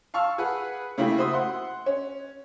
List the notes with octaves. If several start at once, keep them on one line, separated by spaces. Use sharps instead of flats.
F5 A5 C#6 E6 F6
G#4 B4 F#5
C#3 A3 A#3 E4 G4
F#4 C5 E5 C6 D#6
F#5 C6
C#4